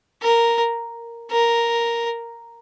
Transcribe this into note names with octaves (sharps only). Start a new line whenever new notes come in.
A#4
A#4